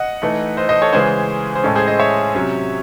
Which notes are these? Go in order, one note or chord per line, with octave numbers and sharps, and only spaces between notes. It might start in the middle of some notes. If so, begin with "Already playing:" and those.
Already playing: D#5 F#5
E3 A3 D#4
C5 D#5
C5 D#5
A4 C#5
C#3 E3 G#3 C#4 G#4 C5
C5
A2 G#3 C#4 A4
G#4 C5
C5 D#5
C#5 E5
C3 F#3 C#4